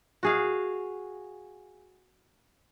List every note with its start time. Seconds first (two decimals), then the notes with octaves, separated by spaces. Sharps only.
0.23 F#4 G#4 F5